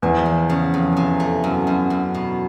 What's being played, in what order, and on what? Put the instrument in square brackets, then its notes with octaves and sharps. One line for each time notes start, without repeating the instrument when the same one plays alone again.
[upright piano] E2 [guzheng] F3
[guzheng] F3
C#3
F2
C3
A3
F#2
F#2
F#2
B2